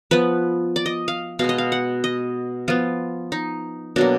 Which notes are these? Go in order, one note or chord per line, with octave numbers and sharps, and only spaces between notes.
F3 B3 B4
D5
D#5
F5
B2 G#3 B3 F5
D#5
F5
F#5
D#5
F3 B3 F4
D#4
B2 F#3 A#3 D4